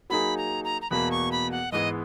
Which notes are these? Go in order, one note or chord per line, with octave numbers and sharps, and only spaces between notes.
F#3 A#3 D#4 G#4 B5
A#5
A#5
A#5
E2 B2 A#3 B5
C#6
B5
F#5
G#2 E3 G#3 B3 D#5